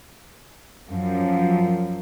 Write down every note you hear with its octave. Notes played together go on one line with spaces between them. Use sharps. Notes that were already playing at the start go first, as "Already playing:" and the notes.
F#2 F3